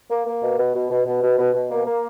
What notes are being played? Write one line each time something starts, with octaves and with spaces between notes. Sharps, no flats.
A#3
A#3
B2
B2
B2
B2
B2
B2
B2
B2
A#3
A#3